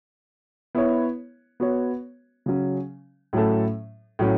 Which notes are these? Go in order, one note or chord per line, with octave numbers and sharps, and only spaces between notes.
B3 E4 C#5
B3 F#4 C#5
C#3 F#3 C#4
A2 F#3 A3 C#4 A4
A2 F#3 C#4